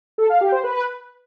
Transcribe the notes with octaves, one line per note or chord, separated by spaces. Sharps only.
A4
F5
G4
C5
B4